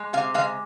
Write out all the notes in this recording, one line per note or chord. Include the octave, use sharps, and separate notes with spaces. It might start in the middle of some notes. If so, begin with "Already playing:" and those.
Already playing: G#3
C3 F5
G#3 F5